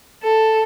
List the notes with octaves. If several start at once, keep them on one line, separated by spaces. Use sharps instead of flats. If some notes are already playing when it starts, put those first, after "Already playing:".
A4